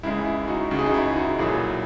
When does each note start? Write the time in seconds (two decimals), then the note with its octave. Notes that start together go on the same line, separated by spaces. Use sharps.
0.03 C#2 C#3 G#3 E4
0.25 E4
0.48 D#4 F#4
0.70 C#2 C#3 G#3 F#4
0.79 G#4
0.86 D#4 F#4
0.94 E4
1.16 D#4 F#4
1.39 B1 A#2 F#3 E4 G#4